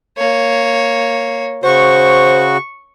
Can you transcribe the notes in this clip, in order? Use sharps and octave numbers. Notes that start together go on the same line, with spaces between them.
A#3 C#5
C#3 F#4 C5 C#6